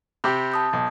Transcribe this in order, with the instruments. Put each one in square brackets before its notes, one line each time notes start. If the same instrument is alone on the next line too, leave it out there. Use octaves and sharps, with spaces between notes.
[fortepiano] C3 G4 [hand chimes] B5
[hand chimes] A5 D#6 G6
[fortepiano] B1